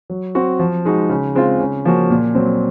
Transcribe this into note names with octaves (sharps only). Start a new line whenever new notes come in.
F#3
C4 F#4
F3
G#3 D#4 F#4
C#3
G#3 C4 F4
C#3
F3 A#3 C#4 F#4
A#2
F#3 C4